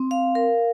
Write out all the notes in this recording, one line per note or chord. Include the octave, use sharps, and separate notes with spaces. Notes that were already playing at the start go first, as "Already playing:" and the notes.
Already playing: C4
F5
A#4